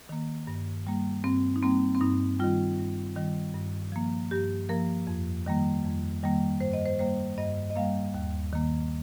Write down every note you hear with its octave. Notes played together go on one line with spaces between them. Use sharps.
D#3 A#3
G2
G3 A#3
G2 C4
D#4
G3 A#3 C4
C4
G2 D#4
D#3 G3 F4
G2
D#3 G3
G2
F3 A#3
G2 G4
F3 A#3 A#4
F2
D#3 G3 A#3
F2
D#3 G3 A#3
G2 C5
D#5
C5
G3 A#3 C5
G2 D#5
D#5
G3 A#3 F5
D#2
D#3 A#3